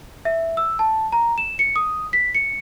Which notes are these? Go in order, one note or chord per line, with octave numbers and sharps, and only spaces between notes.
E5
E6
A5
A#5
E7
C#7
D#6
B6
C#7